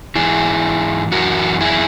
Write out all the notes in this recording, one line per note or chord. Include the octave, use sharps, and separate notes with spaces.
G#2 E3 E4 G#4
F#2 E3 F#4 A#4
E4 G#4